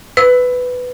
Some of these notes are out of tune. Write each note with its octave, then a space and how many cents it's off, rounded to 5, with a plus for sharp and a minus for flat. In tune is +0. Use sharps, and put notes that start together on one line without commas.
B4 +10 E6 -5